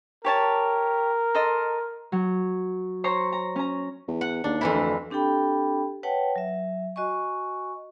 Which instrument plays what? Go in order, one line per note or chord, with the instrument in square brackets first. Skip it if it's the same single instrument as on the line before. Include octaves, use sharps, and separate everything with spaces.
[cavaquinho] G4 C#5 A5 [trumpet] A#4
[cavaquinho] A4 D#5 C6
[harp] F#3
C5 C#5 A#5
A#5
C#4 A#5
[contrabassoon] E2
[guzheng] F#5
[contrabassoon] D#2 [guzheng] D4
[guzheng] F2 E3 E4
[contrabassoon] D2
[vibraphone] C4 D4 G4 A4 G5 B5
B4 C#5 F#5 G5 A5
F#3 E5
F#4 D#5 G#5 C#6